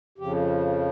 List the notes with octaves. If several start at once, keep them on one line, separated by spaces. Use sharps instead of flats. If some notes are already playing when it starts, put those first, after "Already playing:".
F2 C#3 F3 G4